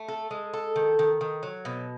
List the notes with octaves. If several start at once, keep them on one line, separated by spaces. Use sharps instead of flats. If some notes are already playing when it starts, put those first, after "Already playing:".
Already playing: A3
A4
G#3
A4
D#3
D#3
D#3
F#3
B2